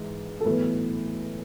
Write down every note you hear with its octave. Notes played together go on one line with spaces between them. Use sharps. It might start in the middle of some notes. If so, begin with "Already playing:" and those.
Already playing: G#2 E3
A4
B1 A2 E3 B4